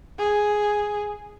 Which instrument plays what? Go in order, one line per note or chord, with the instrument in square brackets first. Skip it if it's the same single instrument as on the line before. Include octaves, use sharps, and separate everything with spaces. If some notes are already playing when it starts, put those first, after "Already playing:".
[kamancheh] G#4